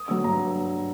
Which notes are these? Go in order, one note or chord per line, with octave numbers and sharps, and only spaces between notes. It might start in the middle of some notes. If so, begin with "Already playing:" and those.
Already playing: D#6
D3 F#3 E6
G2 A#5